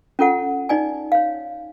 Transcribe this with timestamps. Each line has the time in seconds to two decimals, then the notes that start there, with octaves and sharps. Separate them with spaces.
0.19 C#4 F4 A4 F#5
0.69 D#4 D5 G#5
1.12 C#5 F5